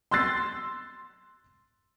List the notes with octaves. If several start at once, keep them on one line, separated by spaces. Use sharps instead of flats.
C6 E6 F#6 A6 C7